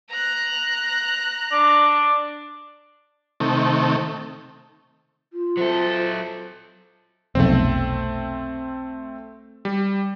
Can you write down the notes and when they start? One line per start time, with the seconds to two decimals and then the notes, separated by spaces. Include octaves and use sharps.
0.11 A#5 F#6
1.52 D4
3.40 C3 D#3 A3
5.33 F4
5.57 F#3 A4 C5 E5
7.35 F1 B1 A3 C4
9.65 G3